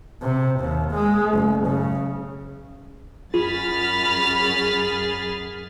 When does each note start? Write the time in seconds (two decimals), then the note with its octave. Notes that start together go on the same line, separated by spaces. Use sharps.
0.23 C3
0.60 D#2
0.92 G#3
1.33 F#1
1.67 C#3
3.34 F#2 F4 G#4 B5 F6 A6